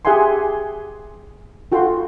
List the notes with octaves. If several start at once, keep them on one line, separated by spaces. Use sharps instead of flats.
G4 G#4 E5 F#5 G#5 C6
F4 F#4 A4 G5 C6